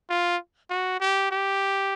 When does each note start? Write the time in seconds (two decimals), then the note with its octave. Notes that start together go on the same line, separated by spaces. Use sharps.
0.10 F4
0.70 F#4
1.01 G4
1.31 G4